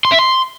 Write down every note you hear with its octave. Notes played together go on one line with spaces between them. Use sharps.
C6
E5
C6